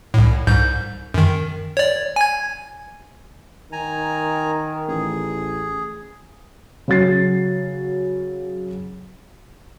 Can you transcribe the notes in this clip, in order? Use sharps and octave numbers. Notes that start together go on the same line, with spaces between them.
C2 A2
C2 G#2 G6
F#2 D#3
C#5 D5
G#5 G#6
D#3 G#5 A#5
A1 G#4
C#3 F#3 A6 C7